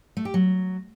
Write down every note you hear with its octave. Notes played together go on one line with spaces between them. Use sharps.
A3
G4
F#3